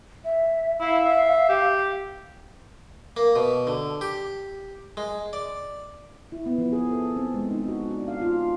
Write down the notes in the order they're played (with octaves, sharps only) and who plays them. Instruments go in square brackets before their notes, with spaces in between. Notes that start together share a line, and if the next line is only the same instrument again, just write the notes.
[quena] E5
[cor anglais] E4 [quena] F5
[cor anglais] E5
G4
[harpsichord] A#3
B2
D3
G4
G#3
D5
[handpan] E4
B3
F3
G#4
A4
C4
G#3
D#4
F#4
D4
F5
F4